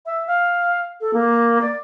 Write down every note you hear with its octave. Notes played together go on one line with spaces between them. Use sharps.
E5
F5
A4
A#3
D5